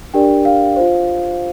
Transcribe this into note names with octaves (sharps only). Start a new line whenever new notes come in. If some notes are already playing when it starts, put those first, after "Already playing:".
D4 G4 A#4 D5 G5
F5
F4 C5